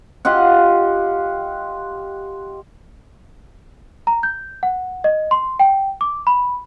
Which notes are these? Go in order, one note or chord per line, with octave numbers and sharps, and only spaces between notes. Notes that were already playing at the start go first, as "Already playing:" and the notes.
F4 G4 D#5 F#5
A#5
G6
F#5
D#5
C6
G5
D6
B5